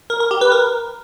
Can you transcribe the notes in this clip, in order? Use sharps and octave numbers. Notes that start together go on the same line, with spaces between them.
A#4
A#4
G4
B4
A#4